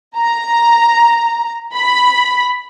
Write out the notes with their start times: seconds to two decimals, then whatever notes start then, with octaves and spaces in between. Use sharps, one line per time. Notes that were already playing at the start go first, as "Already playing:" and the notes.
0.17 A#5
1.74 B5